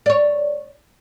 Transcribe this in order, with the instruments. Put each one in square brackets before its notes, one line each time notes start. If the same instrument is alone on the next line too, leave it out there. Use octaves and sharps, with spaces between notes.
[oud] C#5 D5